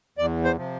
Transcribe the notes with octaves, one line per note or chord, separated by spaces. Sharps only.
E2 D5
C5
C3 F3